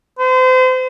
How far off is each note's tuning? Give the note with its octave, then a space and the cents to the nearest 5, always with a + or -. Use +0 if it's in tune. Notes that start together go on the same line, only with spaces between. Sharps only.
C5 -35